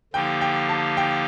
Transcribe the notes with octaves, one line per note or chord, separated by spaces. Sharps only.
D3 F3 A#3 D#4 G4 G5
G5
A5
G5